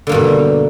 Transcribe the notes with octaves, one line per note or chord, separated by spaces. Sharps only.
G2 B2 D3 A#3